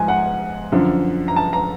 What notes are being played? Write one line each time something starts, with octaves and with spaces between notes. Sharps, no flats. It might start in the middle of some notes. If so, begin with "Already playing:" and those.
Already playing: G#2 F3 G#3 G#5 A#5
F#5
F#2 D3 F3
A#5
A5
A#5